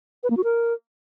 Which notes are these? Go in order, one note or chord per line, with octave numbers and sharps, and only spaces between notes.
B4
A#3
F#4
A#4